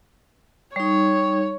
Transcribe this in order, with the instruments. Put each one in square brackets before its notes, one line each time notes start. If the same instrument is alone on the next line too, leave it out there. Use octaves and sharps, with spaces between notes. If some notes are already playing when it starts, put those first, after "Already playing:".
[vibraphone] G3 D#4 [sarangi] C#5